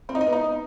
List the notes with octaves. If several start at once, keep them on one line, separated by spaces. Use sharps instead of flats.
C4
D#4
D#5
B3
D#4